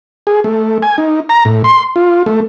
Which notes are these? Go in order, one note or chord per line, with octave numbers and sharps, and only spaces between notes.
G#4
A3
G#5
D#4
A#5
A2
C6
F4
A3